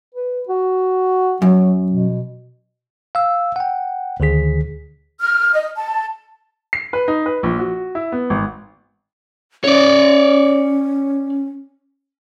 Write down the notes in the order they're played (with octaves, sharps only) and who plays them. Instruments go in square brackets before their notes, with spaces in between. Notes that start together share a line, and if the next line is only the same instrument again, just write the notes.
[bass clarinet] B4
F#4
[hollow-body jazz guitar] F#2 [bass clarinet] F#3
[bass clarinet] B2
[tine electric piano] F5 E6
F#5 G5
D2 D3 D#3 G#4 B6
[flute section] F6
D#5
A5
[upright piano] C7
B4
D#4
B4
A#1
F#4
E4
B3
G#1
[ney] C#4 [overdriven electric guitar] C#5 D5